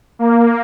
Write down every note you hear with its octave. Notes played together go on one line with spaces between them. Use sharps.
A#3